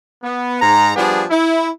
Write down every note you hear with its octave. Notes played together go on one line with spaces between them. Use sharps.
B3
G#2 A#5
F3 G3 B3 D4 G#4
E4